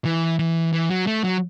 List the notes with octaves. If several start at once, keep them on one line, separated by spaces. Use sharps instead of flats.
E3
E3
E3
F#3
A3
F#3